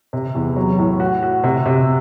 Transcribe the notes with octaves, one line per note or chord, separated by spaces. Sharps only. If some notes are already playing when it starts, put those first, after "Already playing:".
C3
E2
F#3
A2
F#4
F#4
C3
C3